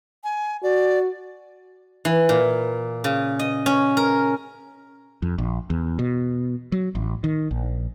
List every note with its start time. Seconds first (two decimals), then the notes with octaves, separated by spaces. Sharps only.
0.24 G#5
0.63 F#4 D5
2.05 E3
2.29 A#2
3.04 C#3
3.39 D#5
3.66 C#4
3.97 A#4
5.22 F2
5.38 A#1
5.70 E2
5.99 B2
6.72 F#3
6.95 A1
7.24 D#3
7.51 A#1